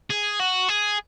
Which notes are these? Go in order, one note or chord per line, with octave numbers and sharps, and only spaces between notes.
G#4
F#4
G#4